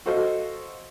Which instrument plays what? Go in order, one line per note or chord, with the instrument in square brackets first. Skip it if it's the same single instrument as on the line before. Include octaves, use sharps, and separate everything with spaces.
[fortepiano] F#4 A4 C5 D#5 F5